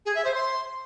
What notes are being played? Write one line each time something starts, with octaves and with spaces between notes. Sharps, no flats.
G#4
E5
C5
C6